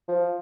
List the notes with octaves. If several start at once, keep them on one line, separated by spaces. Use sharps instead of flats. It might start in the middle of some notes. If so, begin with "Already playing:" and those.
F3